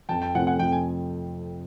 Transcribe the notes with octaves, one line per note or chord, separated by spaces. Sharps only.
F2 G5 A5
G5 A5
C3 F3 A3 C4 F#5 G#5
F#5 G#5
F2 G5
G#5